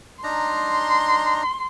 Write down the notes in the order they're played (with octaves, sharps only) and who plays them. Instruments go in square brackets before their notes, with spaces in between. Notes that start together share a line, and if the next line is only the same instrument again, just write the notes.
[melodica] D4 D#4 A#5 [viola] C6